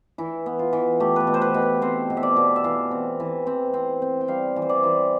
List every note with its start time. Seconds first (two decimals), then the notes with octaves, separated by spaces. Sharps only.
0.18 E3 E4
0.46 B3
0.59 F4
0.73 E3
1.00 A3 G4
1.16 A4 B4
1.27 B2
1.34 C5
1.42 B4
1.54 B2
1.62 B4
1.82 C4 C5
2.10 B2
2.17 E5
2.23 D5
2.36 B2
2.56 E5
2.64 E3 F5
2.91 C4
3.20 E3
3.47 C4
3.74 C4
4.02 C4
4.21 G5
4.28 G3 F5
4.56 E3
4.62 C5
4.69 D5
4.83 E3